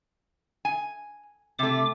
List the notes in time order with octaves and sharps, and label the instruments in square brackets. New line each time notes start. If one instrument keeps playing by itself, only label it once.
[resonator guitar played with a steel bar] G#5
[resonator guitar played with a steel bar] C3 A3 [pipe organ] D6